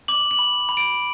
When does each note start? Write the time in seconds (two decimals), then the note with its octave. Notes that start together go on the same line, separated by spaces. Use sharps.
0.08 D6 F#7
0.31 F#7
0.39 B5
0.69 B5
0.77 D7